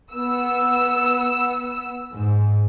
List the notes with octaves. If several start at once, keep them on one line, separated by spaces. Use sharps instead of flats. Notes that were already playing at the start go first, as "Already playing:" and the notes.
B3 E6
G#2